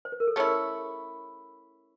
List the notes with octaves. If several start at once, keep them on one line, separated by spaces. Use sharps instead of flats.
C5
B4
A#4
A4
A3 C#4 E4 G#4